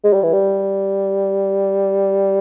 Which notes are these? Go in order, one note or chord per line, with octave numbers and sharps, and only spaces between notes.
G#3
G3
E3
G3